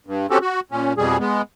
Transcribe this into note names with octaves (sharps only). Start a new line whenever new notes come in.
G2
C4 C#4 F#4 G4 A4
F#4
A#2 C#4
F2 B2 G3 G#4
G#3 B3